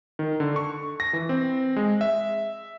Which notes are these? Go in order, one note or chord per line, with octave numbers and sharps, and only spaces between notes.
D#3
D3
C#6
A#6
E3
C4
G#3
E5